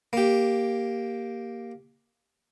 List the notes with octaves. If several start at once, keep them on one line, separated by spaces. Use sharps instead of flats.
A#3 G4